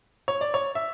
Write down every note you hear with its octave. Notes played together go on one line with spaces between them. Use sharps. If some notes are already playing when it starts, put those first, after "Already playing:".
C#5
D5
C#5
E5